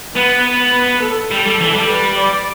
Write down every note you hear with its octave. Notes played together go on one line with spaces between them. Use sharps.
B3 B4
B4
A4
G3 A4
G3
E3
G3
B4
D5